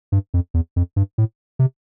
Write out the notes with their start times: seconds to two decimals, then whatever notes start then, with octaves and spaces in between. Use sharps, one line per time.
0.12 G2
0.34 F2
0.54 E2
0.76 F2
0.96 G2
1.18 A2
1.59 C3